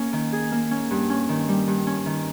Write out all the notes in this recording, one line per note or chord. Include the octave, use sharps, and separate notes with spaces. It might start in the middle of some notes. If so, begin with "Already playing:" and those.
Already playing: A#3 C#4
D#3
G#4
A#3
C#4
G2
C#4
D#3
G3
G2
C#4
D#3